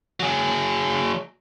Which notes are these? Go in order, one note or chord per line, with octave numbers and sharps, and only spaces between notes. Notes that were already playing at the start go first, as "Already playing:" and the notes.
F#3 G#4